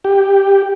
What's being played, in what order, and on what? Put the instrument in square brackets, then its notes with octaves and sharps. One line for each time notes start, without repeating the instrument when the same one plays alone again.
[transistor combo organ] G4